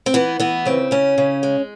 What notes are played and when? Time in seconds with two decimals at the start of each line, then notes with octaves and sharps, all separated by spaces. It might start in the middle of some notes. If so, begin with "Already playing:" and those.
0.06 C4
0.14 E3 B3
0.40 E3 B3
0.65 C#3 C4
0.91 C#3 C#4
1.18 C#3
1.43 G#3